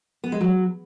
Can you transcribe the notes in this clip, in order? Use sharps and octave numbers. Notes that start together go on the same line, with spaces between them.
B3
G#3
F#3